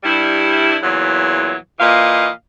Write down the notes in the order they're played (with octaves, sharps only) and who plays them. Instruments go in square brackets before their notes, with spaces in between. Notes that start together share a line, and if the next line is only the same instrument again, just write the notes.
[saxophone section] G2 G3 E4
E2 A#2 E3 F#3
A#2 E3 D#5 F5